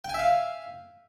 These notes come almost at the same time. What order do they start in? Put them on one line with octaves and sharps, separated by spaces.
G5 G#5 E5 F5